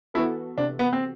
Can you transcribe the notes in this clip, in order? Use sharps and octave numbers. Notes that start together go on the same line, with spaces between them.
E3 B3 E4 F#4 A4
C3 D4
B3
C4